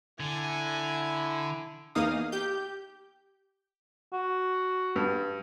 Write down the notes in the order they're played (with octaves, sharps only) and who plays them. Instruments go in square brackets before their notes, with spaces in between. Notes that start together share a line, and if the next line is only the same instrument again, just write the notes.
[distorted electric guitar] D3 [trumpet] E4 [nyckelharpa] G#5
[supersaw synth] E2 A#3 D#4 F5 D#6
G4 G6
[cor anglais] F#4
[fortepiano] G2